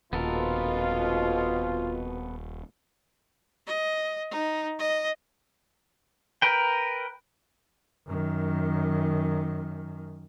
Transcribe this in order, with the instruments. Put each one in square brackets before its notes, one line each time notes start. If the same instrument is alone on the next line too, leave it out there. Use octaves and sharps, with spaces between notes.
[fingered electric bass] D#1 [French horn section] F2 B2 [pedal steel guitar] B3 A4 A#4 [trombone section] F4
[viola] D#5
D#4
D#5
[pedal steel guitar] A#4 B4 G5
[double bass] F#2 D#3